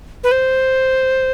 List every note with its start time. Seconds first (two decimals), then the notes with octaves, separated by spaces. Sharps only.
0.24 B4
0.31 C5